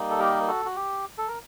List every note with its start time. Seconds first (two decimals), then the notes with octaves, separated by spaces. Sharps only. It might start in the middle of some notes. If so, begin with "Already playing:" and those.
Already playing: G3 A#3 D#4
0.10 A4
0.19 G4 A#4
0.47 F#4 A4
0.65 F#4
0.76 G4
1.18 A4
1.28 A#4